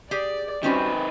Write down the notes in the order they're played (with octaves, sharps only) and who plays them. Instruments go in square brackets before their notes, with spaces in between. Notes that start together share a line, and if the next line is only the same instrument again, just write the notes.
[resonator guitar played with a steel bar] G4 G#4 [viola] D5
[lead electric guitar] D#3 B4 [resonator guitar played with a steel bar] G3 C#4 F#4 [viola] C4